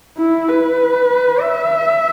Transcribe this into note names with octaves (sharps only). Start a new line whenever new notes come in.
E4
B4
E5